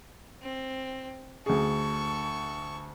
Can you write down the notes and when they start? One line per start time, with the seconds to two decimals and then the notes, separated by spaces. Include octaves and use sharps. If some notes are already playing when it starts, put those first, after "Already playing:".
0.42 C4
1.46 D2 G#4 A4 C#6